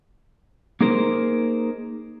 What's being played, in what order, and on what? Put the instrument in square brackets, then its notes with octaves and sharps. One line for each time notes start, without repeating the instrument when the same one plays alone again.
[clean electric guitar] A#3 D#4 G#4 A#4 C5